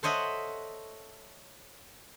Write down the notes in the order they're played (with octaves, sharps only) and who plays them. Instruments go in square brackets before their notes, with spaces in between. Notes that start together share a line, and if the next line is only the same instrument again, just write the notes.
[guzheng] A4 C5 C#5 D#5 E5 F#5